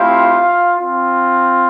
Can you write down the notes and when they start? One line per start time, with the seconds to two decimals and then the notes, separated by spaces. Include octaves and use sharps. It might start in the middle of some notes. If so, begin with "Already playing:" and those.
Already playing: A3 C4 E4 F4 G4 F5
0.77 C4 F4